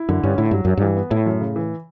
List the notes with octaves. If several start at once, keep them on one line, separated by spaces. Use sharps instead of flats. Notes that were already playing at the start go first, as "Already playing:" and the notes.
Already playing: E4
F#2 D3
G2 C#4
A2 E4
G2 F#3
F#2 F#3
G2 E3
B3
A2 E4
F#2
C#3
E3